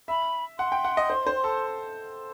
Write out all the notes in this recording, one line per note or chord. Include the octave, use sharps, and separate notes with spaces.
E5 B5
F#5 C6
G5
F#5
D#5
C5
C5
A4